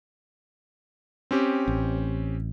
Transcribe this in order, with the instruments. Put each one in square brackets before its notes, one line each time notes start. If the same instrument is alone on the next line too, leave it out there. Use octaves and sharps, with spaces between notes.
[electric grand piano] C4 C#4 G4
[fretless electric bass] A1